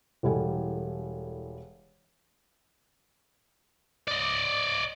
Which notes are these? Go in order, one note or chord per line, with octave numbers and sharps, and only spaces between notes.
E1 E3 G3 A4 G#5
D5 D#5